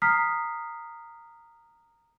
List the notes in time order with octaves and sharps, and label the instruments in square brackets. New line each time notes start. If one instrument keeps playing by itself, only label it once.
[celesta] A#5 D#6 F6 B6 C7